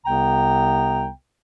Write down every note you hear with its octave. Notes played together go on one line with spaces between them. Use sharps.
C2 C3 B3 G5 A#5